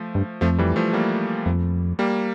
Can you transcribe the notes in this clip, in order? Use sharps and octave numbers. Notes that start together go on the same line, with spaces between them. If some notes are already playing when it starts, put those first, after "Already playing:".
Already playing: F3 A3
G2
F2 F3 A3
E3 G3
F3 A3
G3 A#3
F2
G3 A#3